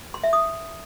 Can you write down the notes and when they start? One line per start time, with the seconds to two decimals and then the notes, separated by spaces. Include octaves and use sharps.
0.14 C6
0.24 E5
0.33 D#6